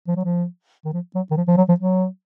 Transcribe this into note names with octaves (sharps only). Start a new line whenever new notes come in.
F3
F#3
F3
D#3
F3
F#3
D#3
F3
F3
F#3
F3
F#3